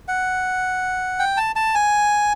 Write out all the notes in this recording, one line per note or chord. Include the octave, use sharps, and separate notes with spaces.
F#5
G5
A5
A5
G#5